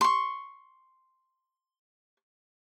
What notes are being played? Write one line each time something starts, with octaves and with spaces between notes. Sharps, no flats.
C6 C#6